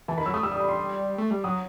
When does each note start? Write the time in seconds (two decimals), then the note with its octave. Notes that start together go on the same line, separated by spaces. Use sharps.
0.08 E3 A5
0.17 D#3 B5
0.26 F#3 E6
0.34 A3 D#6
0.43 G3 E6
0.52 D#6
0.60 B5
0.69 C6
1.18 A3
1.31 G3
1.44 F#3 D#6